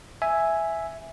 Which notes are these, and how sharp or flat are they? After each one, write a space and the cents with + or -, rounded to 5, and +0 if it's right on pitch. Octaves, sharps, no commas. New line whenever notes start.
E5 +0 G#5 +0